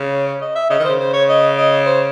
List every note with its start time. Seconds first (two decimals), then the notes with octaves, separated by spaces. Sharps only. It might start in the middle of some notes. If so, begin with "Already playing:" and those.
Already playing: C#3
0.12 C#5
0.26 C#5
0.41 D#5
0.56 E5
0.70 C#3 D#5
0.79 D#3
0.85 C#3 C5
1.00 C5
1.14 C#5
1.29 D#5
1.58 D#5
1.86 C5